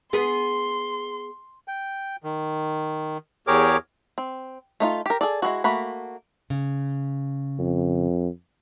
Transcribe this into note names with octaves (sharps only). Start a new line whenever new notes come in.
B3 G#4 C6
G5
D#3
E2 G4 G#4 A#4 C#5 D6
C4
A3 D#4 F4
G4 A#4
G#4 A4 D5
G#3 A3 E4 F#4
A3 A#3 F#4 B5
C#3
F2